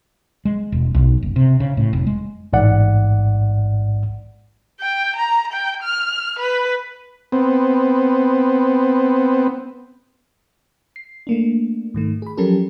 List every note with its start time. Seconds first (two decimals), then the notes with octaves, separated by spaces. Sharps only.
0.45 G#3
0.72 E1
0.95 B1
1.23 F#1
1.36 C3
1.60 C#3
1.77 A2
1.93 F1
2.07 G#3
2.53 A1 G#2 D5 F#5
4.80 G5
5.16 A#5
5.52 G5
5.82 F6
6.39 B4
7.32 B3 C4
10.96 C7
11.27 A3 A#3 D4
11.94 G#2 D#3 A3
12.22 G#4 B5
12.37 F3 F#3 C#4 G4 A4 A#4